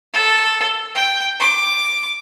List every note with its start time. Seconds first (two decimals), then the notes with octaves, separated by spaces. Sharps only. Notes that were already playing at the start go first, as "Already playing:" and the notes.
0.14 A4
0.95 G5
1.40 D6